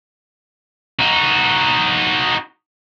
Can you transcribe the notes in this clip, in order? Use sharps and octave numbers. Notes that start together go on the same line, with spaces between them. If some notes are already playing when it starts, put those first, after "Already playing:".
D#4 F#4